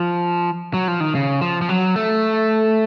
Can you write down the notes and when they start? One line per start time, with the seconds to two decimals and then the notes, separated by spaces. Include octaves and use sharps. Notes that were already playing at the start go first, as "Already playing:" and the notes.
Already playing: F3
0.74 F#3
0.88 F3
1.00 D#3
1.15 C#3
1.41 F3
1.62 F3
1.69 F#3
1.96 A3